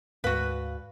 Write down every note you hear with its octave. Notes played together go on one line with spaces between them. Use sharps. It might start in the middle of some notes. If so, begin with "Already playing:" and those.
D2 G#2 F#4 B4 F5